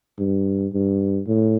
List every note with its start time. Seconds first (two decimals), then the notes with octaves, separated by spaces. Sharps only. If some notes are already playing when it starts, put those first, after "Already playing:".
0.19 G2
0.73 G2
1.27 A2